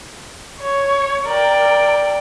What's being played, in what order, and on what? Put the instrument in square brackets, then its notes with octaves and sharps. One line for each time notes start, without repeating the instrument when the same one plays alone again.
[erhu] C#5
[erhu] A#4 [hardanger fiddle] D5 G5